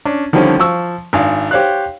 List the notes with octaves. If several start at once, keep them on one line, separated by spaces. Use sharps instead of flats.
C#4 D4
D3 D#3 F3 G3 C4 C#4
F3 C#6 E6
G#1 D4 F5 G#5
G4 C5 C#5 F5 F#6